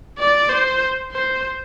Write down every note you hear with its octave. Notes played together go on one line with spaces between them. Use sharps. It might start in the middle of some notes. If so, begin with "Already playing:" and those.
D5
C5
C5